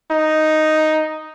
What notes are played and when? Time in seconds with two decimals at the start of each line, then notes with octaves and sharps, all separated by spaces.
0.11 D#4